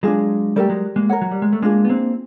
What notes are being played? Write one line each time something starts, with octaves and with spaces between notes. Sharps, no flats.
F#3 G#3 D4 F4 G#4
G3 A3 G4 A#4 D5
F#3 G#3
G#3 A#3
A#4 C#5 F#5
F#3
G3
G#3
A3
G#3 A#3 D4 F4 G#4
B3
A#3 C4